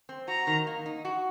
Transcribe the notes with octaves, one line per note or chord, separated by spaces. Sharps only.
C4
F#4 A#5
D#3
A#3
D#4
F#4